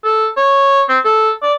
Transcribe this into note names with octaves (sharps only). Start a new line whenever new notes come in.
A4
C#5
C4
A4
D5